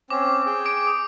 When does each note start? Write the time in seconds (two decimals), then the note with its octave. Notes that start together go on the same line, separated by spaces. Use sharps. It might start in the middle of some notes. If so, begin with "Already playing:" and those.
0.10 C4 C#4 D6
0.46 G#4 G5
0.66 D6 D7
0.87 D#6